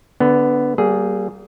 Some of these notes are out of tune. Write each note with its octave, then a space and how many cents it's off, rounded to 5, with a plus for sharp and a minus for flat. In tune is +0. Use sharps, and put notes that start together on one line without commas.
D3 -5 B3 +5
G3 -35 A#3 +0 G#4 +0